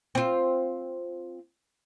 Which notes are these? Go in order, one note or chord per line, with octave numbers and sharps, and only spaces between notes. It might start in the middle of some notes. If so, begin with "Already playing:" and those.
C4 F4